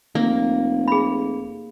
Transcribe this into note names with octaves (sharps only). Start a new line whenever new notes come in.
F1 A#3
G#4 B5